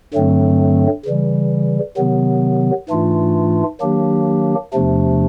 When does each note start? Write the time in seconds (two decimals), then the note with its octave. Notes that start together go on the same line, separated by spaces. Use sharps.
0.13 G2 D3 F#3 A3 C4
1.06 C#3 E3 G3
1.97 C3 D#3 F#3 B3
2.90 G#2 E3 A3 D4 F4
3.81 D#3 F#3 A#3 D4 G4
4.73 E2 C3 F3 A3 D4